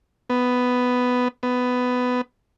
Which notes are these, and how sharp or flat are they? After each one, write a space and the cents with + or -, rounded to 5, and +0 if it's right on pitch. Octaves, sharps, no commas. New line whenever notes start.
B3 +10
B3 +15